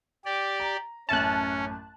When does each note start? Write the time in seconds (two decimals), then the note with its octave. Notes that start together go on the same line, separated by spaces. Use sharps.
0.25 G4 D5
0.60 A#5
1.09 A1 F#2 C#4 E5 A5 F#6